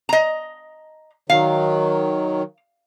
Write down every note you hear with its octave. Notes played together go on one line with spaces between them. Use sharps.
D#5 A#5
D#3 F#3 F5